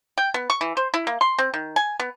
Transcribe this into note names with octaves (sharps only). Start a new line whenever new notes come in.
G5
B3
C#6
E3
C5
E4
A#3
C6
C4
D#3
G#5
B3